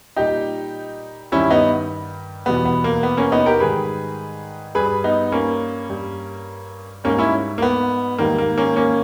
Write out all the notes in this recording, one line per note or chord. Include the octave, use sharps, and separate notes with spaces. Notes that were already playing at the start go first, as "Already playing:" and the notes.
A#2 G3 D#4 G4
G2 D#3 G3 C#4 E4
B3 D#4
E2 B2 G3 B3
B3
A#3
B3
A#3 C#4
B3 D#4
G4 A#4
G#2 D#3 G3 G#4 B4
G2 G3 G#4 B4
B3 D#4
A#3 C#4
G2 G3
G#2 G3 A#3 C#4
C#4 E4
A#3
B3
G#2 D#3 G3 A#3
A#3
A#3 C#4
A#3 C#4